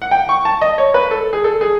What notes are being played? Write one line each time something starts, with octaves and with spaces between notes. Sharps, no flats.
F#5
G5
C#6
A5
D#5
C#5
B4
A4
G#4
A4
G#4